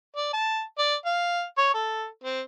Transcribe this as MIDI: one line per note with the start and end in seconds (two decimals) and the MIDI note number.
0.16 0.33 74
0.33 0.61 81
0.78 0.95 74
1.05 1.43 77
1.58 1.72 73
1.74 2.06 69
2.24 2.41 60